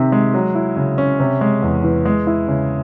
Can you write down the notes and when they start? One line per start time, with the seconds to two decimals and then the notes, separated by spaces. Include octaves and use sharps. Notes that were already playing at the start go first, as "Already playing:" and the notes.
Already playing: C3 D#3 C4
0.12 G#3
0.34 F#3
0.55 E4
0.77 C#3
0.98 C#4
1.20 C3
1.41 G#3
1.63 E2
1.84 E3
2.05 G#3
2.27 E4
2.48 C#3